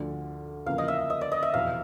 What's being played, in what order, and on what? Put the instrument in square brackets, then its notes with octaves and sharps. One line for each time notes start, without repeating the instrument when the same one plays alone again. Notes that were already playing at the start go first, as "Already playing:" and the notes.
Already playing: [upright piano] D2 D3 F3 A3 D4
[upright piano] E2 C#3 F3 A#3 [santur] F5
[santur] D#5
E5
D#5
D5
D#5
E5
[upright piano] F1 E2 B2 [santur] F5